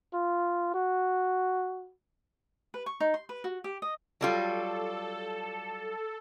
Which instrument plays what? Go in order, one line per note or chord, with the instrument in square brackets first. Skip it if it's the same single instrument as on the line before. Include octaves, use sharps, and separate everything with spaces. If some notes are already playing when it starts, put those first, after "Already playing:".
[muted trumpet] F4
F#4
[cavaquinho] B4
C#6
D#4
C6
B4
F#4
G4
D#5
[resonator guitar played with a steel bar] F#3 G3 F4 [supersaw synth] A4